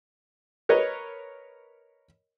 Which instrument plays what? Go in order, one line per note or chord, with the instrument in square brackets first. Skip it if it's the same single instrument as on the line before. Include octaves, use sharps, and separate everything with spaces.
[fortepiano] A#4 B4 C#5 D#5